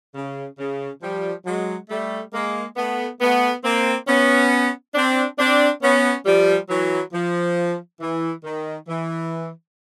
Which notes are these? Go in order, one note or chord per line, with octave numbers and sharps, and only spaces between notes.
C#3
C#3
F3 G3
F#3 G#3
G3 A3
G#3 A#3
A3 B3
A3 B3
A#3 C4
B3 C#4
C4 D4
C4 D4
B3 C#4
F3 G3
E3 F#3
F3
E3
D#3
E3